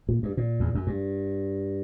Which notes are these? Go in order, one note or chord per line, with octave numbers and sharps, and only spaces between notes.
A#2
G2
A#2
E2
F#2
G2